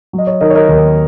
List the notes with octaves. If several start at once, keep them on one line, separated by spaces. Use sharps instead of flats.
F#3
D#5
C#5
D#3 A#4 D#5
C#5
A#4 D#5
D#2 A#4